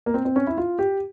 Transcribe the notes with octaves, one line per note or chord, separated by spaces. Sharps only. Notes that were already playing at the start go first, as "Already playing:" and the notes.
A#3
C4
C4
C#4
E4
F4
G4